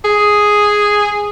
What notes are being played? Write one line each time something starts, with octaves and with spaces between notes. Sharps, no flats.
G#4